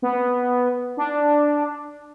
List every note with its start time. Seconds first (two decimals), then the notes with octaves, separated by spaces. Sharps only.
0.02 B3
0.97 D4